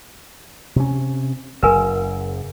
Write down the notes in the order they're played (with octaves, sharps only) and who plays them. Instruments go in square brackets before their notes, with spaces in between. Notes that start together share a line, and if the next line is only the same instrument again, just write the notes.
[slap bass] C3 C#4
[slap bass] F#1 F#2 [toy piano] A#4 B4 G#5